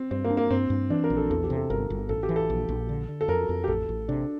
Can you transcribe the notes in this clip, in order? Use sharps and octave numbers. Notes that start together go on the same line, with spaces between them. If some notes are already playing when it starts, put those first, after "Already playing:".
Already playing: C4
G2 C4
A#3
D4
A#3
G2 C4
G2
E3 D4
A#4
A#1
A4
E2 A4
G4
C3
A4
G1 A#4
G1
A1 A4
G4
E3
A4
A#1
A#1
D3
D3
A4
F2 A#4
F2
G4
A1 A4
A1
C3 D4